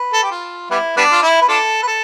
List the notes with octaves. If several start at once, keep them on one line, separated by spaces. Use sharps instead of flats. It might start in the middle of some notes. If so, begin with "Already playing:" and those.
Already playing: B4
A4
G4
F4
G3 B3 E4
G3 B3 D4
F4
E4
B4
D4 F4 A4
B4
A4